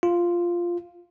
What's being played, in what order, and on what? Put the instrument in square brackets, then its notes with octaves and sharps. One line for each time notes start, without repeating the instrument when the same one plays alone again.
[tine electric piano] F4